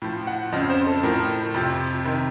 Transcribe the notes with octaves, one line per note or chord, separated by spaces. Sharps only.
A2 F3
F#5
F2 C#3 F3 D#5
C5
A4
A2 F3 A#4
F2 C3 F3
C3 D#3